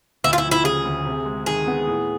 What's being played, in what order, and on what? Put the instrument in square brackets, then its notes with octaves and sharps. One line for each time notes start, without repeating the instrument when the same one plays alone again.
[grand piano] D2 [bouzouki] E4
[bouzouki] F4
E4
[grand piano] F3
[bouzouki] E4
[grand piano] C#3 [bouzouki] G#4
[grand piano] D2
C3
G#3
[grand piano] D#3 [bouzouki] G#4
[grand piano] B3
A2